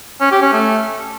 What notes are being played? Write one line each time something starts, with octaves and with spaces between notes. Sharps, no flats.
C#4
G4
C#4
A3